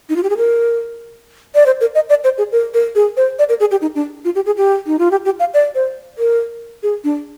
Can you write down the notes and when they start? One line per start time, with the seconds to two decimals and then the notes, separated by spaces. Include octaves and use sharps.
0.09 D#4
0.16 F4
0.23 G4
0.30 G#4
0.37 A#4
1.55 D5
1.66 C5
1.81 A#4
1.95 D#5
2.10 D5
2.24 C5
2.38 G#4
2.52 A#4
2.74 A#4
2.95 G#4
3.17 C5
3.39 D5
3.49 A#4
3.60 G#4
3.71 G4
3.82 D#4
3.96 D4
4.25 F4
4.35 G4
4.46 G#4
4.57 G4
4.87 D#4
4.99 F4
5.11 G4
5.25 G4
5.40 F5
5.54 D5
5.75 C5
6.18 A#4
6.83 G#4
7.04 D4